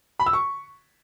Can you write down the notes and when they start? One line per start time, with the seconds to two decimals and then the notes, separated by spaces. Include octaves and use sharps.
0.20 B5
0.26 E6
0.33 C#6